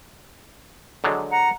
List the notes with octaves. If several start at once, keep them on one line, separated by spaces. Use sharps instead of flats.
D3 F#3 G#3
F#5 A#5